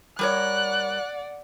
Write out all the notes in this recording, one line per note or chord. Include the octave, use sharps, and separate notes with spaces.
G3 A#4 C#5 D5 F#5 F#6